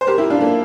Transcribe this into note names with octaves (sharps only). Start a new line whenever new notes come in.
C5
G4 A#4
E4 G4
D4 F4
A#3 D4